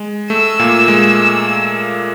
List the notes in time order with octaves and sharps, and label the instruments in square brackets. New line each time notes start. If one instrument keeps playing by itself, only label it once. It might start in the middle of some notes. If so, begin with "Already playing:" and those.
Already playing: [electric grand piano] G#3
[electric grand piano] A3 [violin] E6
[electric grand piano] A#2 A#3
G#3